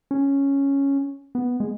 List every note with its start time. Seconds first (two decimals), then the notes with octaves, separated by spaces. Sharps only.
0.11 C#4
1.35 B3
1.60 G#3